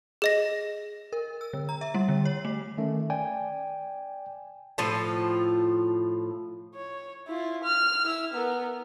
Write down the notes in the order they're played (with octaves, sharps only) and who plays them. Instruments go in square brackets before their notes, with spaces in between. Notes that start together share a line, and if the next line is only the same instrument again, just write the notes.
[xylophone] G#4 D#5 A#6
[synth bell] A#4
E6
D3
A#5
E5
G3
D3
C#5
A3
[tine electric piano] D#3 A3 C#4
D5 G5 G#5
[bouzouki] A2 F3 F4 A4
[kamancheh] C#5
E4 F4
F6
E4 E6
B3 A#4